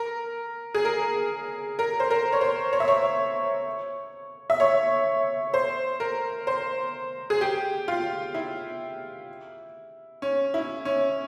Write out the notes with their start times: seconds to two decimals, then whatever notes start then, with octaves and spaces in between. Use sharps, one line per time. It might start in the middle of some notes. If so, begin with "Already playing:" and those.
Already playing: A#4
0.75 G#4
0.85 A#4
1.79 A#4
2.00 C5
2.10 A#4
2.33 C#5
2.41 C5
2.73 C#5
2.80 E5
2.88 C#5
4.50 E5
4.60 C#5
5.54 C5
6.00 A#4
6.47 C5
7.30 G#4
7.41 G4
7.88 F4
8.34 E4
10.22 C#4
10.54 E4
10.85 C#4